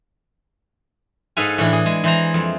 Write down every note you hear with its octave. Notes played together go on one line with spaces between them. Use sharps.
G#2 A4 B4 F5 G#5
A2 E3 D4
G#4
G#3
E3 C5 A#5
F2